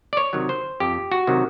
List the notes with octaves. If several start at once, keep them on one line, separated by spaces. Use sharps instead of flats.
D5
C#5
C3 D#3 F#3
C5
F2 G4
F#4
C3 D#3 F#3